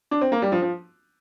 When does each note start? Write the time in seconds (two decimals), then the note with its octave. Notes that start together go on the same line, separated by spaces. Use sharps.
0.11 D4
0.21 C4
0.32 A#3
0.42 G3
0.52 F3
0.62 F3